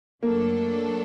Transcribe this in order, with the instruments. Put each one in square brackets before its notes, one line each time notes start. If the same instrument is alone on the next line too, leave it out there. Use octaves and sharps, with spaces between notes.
[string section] F#2 F#3 A3 D4 A4 [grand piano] A#3